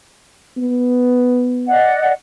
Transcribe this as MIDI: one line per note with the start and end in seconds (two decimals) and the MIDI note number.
0.57 1.76 59
1.68 2.12 74
1.68 2.12 75
1.68 2.12 78